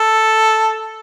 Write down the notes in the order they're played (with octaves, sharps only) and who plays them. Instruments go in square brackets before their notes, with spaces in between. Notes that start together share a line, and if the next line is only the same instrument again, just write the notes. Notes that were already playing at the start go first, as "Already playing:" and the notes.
Already playing: [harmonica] A4